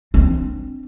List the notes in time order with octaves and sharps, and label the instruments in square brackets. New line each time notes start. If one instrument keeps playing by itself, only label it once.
[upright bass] C4 D4